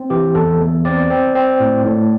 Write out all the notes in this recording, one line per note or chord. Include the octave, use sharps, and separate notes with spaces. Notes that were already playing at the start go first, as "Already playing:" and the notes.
Already playing: C4
E3 G4
E2 A4
E2
C4 D5
C4
C4
A2
A2